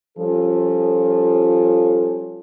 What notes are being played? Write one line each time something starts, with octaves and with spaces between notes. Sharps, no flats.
F3 G3 C#4 F4 A4